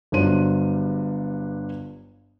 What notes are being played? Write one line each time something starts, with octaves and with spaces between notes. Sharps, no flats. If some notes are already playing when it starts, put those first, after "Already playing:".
G1 G2 F#3 D4 C5 D#7